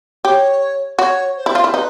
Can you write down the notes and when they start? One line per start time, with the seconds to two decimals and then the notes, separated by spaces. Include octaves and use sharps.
0.25 G4 C#5
0.98 F#4 C#5
1.37 C5
1.46 E4
1.55 F4
1.64 E4
1.74 D#4 B4